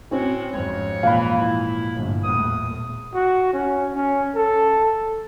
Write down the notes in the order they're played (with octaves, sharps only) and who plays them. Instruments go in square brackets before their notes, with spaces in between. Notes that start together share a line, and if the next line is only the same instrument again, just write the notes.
[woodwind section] A2 F#4 [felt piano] C4 C#4
[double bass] F2 G#2 [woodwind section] C#5
[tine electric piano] A#2 [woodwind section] E3 [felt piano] F5 B5
[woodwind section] E4
[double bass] G1 A2
[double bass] E2 A2 [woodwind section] D#6
[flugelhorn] F#4
C#4
C#4
A4